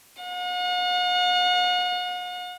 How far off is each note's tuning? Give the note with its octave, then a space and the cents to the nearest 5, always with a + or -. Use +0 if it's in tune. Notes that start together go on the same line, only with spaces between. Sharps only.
F#5 -45